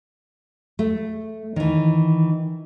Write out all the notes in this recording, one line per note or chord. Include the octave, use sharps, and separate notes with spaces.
A3
D#3 E3